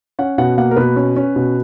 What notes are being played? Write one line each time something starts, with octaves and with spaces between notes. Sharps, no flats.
C#4 F#5
B2 F#5
A#3 F#5
A#4
B2 B4
C#4
C#4
B2